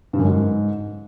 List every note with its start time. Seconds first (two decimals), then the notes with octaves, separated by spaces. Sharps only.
0.13 G2
0.19 F#2
0.24 G#2